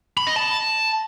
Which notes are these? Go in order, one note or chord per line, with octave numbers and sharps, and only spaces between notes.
B5
D#5
A5